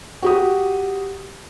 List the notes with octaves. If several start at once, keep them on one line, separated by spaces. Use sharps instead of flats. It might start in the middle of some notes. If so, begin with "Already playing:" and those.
F#4 G4 D#6